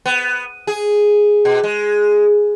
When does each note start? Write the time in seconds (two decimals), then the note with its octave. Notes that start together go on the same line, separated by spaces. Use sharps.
0.06 B3
0.67 G#4
1.45 B2
1.63 G#3